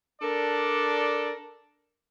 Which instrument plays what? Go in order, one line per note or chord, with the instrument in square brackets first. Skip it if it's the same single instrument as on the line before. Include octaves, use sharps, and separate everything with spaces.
[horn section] D4 A4 A#4 D5